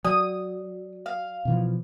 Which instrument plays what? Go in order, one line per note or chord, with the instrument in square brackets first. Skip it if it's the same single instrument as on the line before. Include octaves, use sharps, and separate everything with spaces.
[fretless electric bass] F#3 [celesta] D5 [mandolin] D#6
[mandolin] F5
[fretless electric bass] B2 E3 F3